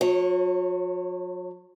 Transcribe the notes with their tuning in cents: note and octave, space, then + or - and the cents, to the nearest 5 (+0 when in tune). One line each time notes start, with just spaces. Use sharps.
F#3 -45 C#5 +0